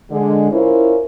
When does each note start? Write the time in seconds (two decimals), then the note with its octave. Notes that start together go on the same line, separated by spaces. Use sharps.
0.11 D3 G#3
0.52 C#4 E4 F4 A#4 C5